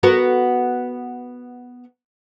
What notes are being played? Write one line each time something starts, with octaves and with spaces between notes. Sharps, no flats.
B3 F#4 A#4